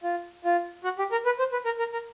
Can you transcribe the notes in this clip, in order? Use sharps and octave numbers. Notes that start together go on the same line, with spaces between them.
F4
F4
F#4
G4
A#4
B4
C5
B4
A#4
A#4
A#4